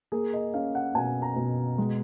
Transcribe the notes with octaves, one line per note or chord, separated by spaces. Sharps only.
A#3 G#4
D#5
C#4 F5
F#5
B2 G#5
A#5
B2
G#3